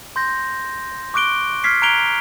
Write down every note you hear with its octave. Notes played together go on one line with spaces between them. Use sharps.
C6 G6 A#6
C#6 D6 F#6 D7 G7
F6 G#6 B6 C7
A#5 F#6 G#6 D7 F7 G7